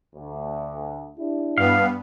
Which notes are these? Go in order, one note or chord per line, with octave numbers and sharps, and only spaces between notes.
D2
D4 E4 G4
G2 B3 F5